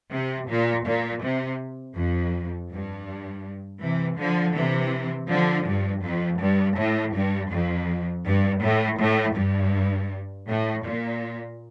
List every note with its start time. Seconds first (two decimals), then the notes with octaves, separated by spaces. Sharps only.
0.11 C3
0.49 A#2
0.86 A#2
1.23 C3
1.96 F2
2.71 G2
3.81 C3 E3
4.18 D3 F3
4.55 C3 E3
5.30 D3 F3
5.66 G2
6.03 F2
6.41 G2
6.78 A2
7.15 G2
7.52 F2
8.26 G2
8.62 A2
9.00 A2
9.36 G2
10.48 A2
10.84 A#2